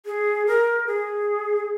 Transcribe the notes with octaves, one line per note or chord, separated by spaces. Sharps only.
G#4
A#4
G#4